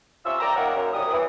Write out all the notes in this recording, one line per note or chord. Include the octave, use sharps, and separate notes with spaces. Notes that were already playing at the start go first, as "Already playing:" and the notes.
C3 C#4 F4 C5 E5 E6
D5 G5 A#5
A#3 D#4 A#4 C#5 F#5
F#2
C2 G3 D#6
E3